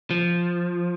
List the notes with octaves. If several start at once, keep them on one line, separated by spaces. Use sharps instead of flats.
F3